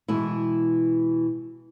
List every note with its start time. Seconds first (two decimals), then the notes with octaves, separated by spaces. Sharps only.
0.08 B2 E3 G#3 E4